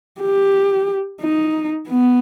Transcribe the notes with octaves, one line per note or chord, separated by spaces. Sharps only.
G4
D#4
B3